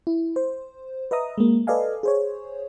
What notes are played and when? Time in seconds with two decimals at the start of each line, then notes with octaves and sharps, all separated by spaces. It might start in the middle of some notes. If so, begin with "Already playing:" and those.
0.07 E4
0.36 C5
1.11 B4 D#5 E5 A#5 D#6
1.38 G#3 A#3
1.67 A4 B4 D5 D#5 F5 G#5
2.03 G#4 C5 C#5